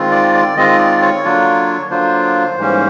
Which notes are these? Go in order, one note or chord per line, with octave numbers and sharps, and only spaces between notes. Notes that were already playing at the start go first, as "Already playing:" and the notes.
Already playing: D#3 G#3 C4 F4
D5
D5
D#3 G#3 C4 F4 D#5
D5
C#5
D3 F#3 A#3 D4 F4
D3 F#3 A#3 D4 F4 C5
G#2 E3 G3 A#3 C#4